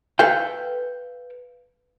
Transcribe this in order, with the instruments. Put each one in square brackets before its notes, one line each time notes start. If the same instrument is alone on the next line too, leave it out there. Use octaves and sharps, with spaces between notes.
[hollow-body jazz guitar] A4 B4 F5 G5